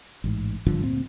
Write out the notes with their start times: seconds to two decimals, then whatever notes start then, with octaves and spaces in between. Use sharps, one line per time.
0.24 A1 G#2
0.66 G#1 G2 D3 F3
0.83 D2 A#2 C4